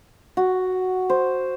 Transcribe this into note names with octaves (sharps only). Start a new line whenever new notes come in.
F#4
C5